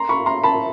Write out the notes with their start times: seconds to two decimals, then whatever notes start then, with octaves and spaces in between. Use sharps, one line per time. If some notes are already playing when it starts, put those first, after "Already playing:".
Already playing: A#5 C6
0.09 B5 C#6
0.26 A#5 C6
0.44 A5 B5